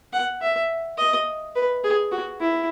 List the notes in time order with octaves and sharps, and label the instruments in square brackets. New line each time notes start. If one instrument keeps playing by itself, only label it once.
[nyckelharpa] F#5
E5
D#5
B4
G#4
F#4
E4